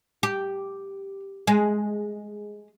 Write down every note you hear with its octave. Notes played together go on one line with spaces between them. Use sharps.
G4
G#3